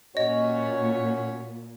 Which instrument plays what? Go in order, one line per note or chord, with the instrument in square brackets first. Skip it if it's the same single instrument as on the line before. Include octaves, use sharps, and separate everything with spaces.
[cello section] A#2 [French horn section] C#4 F#4 C#5 [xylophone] D#5